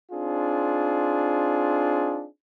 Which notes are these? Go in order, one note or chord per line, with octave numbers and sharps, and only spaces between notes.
C4 D4 D#4 F4 G#4